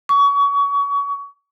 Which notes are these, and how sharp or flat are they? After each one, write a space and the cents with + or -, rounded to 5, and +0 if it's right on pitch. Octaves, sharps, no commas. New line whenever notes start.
C#6 +30